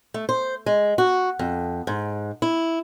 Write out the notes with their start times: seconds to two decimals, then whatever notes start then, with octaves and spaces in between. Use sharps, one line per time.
0.14 A3
0.29 C5
0.66 G#3
0.98 F#4
1.39 F2
1.87 G#2
2.42 E4